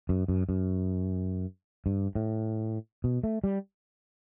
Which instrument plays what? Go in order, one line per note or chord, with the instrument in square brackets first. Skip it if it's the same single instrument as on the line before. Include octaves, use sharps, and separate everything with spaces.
[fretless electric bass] F#2
F#2
F#2
G2
A2
B2
A3
G3